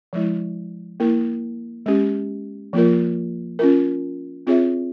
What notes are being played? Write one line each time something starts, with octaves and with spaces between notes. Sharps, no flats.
F3 G#3 E4
A#3 E4 A#4
G#3 C#4 G4
F3 A#3 F4 A#4
C#4 F4 A#4
C4 F4 G#4 C#5 E5